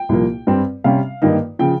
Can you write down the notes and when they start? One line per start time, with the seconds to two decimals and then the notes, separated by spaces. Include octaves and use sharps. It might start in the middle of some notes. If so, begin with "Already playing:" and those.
Already playing: G5
0.09 C2 A#2 F3 A#3
0.47 G2 G3 C4
0.84 C3 G3 C#4 F5
1.22 G2 D#3 A#3 D#4
1.59 C#3 F3 G5